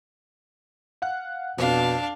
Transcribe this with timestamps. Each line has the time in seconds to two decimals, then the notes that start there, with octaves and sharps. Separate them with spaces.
1.02 F5 F#5 F#6
1.58 F2 B2 D4 F5